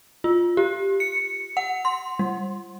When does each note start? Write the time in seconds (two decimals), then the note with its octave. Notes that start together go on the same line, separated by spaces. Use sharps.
0.24 F4
0.57 G4
1.00 C#7
1.57 F#5
1.85 C6
2.19 G3